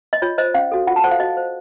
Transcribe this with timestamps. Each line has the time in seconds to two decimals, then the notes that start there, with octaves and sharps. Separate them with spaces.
0.13 D#5
0.22 F4 C#5
0.38 C5 D#5
0.54 C#4 F5
0.72 F#4 A4
0.87 F4 F#5
0.96 A5
1.04 A4 C5 F#5
1.11 F5
1.20 F#4 D#5
1.37 C5